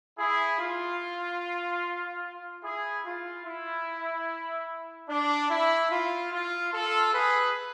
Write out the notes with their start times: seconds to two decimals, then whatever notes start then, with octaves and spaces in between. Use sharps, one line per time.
0.19 E4 G#4
0.60 F4
2.64 E4 G#4
3.05 F4
3.46 E4
5.09 D4
5.50 E4
5.91 F4
6.32 F4
6.73 F4 A4
7.14 G#4 B4